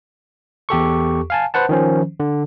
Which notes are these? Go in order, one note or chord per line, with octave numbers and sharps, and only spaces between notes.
E2 G4 A4 C#6
F5 G#5 A5
B4 C5 F#5 A5
D#3 F3 C#4 C5
D3